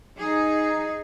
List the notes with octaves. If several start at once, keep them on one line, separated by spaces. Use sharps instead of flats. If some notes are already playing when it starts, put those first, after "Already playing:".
D#4 G#4